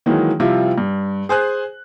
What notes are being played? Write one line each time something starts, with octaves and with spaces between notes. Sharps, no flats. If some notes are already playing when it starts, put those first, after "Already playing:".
D#3 E3 F#3 G#3 A#3
C3 F3 G3 E4 F4
G2
G#4 C5 G#5 F#6